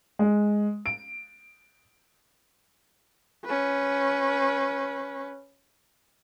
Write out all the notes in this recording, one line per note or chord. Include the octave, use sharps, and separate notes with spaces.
G#3
D7
C#4 B4